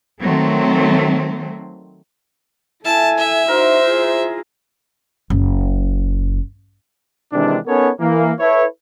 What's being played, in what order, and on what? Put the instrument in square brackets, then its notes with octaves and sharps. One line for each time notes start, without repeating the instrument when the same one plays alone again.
[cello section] D#3 F#3 A3 C4
[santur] E4 [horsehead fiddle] A4 G#5 [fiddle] A5
[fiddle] E5
[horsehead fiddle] D#4 F#4 [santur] A#4 [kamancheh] C5
[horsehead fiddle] F4 G#4
[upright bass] F#1
[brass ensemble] C3 D#3 E3 G#3 D4
B3 C#4 D#4 A4 A#4 C#5
E3 A#3
E4 A4 B4 C#5